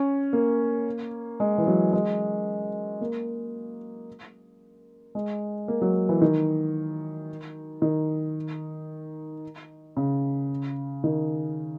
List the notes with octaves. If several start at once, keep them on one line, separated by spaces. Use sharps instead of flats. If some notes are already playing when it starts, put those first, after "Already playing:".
Already playing: C#4
A#3
G#3
E3
F#3
G#3
A#3
G#3
A#3
F#3
E3
D#3
D#3
C#3
D#3